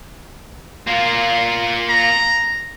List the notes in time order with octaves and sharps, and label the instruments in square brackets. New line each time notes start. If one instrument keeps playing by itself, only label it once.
[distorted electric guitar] A#3 F4
[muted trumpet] A#5